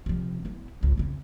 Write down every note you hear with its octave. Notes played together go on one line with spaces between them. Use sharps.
C3 F3
B3 E4
G#1 C#2
F2 C#3